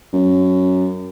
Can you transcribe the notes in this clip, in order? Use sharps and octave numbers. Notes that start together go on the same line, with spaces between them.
F#2